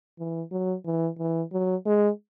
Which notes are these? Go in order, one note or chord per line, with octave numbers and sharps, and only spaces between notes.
E3
F#3
E3
E3
F#3
G#3